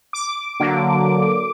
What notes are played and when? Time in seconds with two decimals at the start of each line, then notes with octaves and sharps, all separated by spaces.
0.13 D6
0.60 D3 F#3 A#3